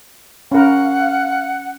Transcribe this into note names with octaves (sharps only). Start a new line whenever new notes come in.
C#4 A#4 F5 F#5